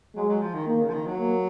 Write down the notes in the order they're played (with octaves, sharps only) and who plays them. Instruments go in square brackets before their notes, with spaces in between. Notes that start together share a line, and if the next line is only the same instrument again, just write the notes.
[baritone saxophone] F#3 [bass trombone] G#3
[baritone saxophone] F#3
F3
D#3
[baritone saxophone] D#3 [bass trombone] A#3
[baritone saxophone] C#3
F3
D#3
F#3
[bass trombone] A#3